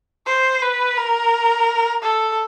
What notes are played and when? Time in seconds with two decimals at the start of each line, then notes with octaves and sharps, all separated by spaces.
0.27 C5
0.62 B4
0.97 A#4
2.03 A4